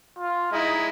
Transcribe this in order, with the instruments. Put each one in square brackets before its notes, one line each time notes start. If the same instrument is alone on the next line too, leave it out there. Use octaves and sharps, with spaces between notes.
[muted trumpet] F4
[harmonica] G#3 E4 [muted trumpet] D#4